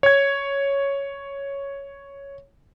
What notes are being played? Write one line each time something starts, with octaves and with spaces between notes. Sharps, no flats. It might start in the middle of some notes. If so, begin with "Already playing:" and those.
C#5 G#6